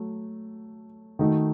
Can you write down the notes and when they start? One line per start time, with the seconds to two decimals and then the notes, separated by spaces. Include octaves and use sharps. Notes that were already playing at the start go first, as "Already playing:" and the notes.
Already playing: F#3 A3
1.19 D#3 A3 D#4 F#4